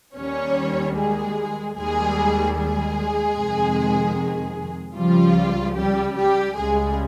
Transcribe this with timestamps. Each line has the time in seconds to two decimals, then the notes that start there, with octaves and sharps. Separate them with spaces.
0.16 D#2 D#3 G3 C#4 C#5
0.96 G#3 G#4
1.76 D#2 D#3 G3 G#3 G#4
2.56 G#3 G#4
3.37 F2 C3 D#3
4.97 C#2 C#3 F3 G3 F4
5.77 G3 G4
6.17 G3 G4
6.57 C#2 C#3 G3 G#3 G#4